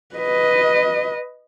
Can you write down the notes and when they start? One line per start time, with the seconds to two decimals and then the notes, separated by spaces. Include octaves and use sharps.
0.16 B4 D#5